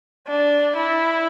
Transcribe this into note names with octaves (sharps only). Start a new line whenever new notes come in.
D4
E4